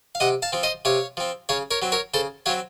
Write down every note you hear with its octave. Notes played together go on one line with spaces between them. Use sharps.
F5
C3 D#5 F#5
F5 A5
F3 C4
C5 D#5
C3 C#5 F5
F3 C4
C#3 C#5 F5
A#4 C#5
F#3 C4
A#4 C#5
C#3 A4 C5
F#3 C4 C#5 F5